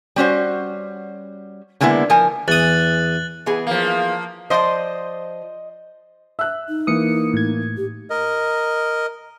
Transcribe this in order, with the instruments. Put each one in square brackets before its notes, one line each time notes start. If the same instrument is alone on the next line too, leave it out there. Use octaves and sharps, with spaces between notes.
[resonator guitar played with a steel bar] G3 C#4 F#4 C5
D3 G#3 A#3 B3 E4
F3 A#4 G#5
[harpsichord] E2 D#6 [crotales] F#6 A6 F#7
[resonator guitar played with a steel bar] E3 B3 G#4
[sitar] F3 A#3
[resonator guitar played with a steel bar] F3 C5 D5 [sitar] D#5
[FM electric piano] E5 [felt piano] E6 F#6
[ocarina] D#4
[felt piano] E3 A#3 [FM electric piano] D#6 C#7
[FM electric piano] A2 G#6
[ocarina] G4
[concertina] A#4 D#5